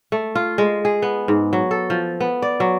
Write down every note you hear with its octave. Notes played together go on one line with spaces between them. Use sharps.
A3
F4
G#3
G#4
B3
G#2
F#3
A4
F3
B3
D5
F#3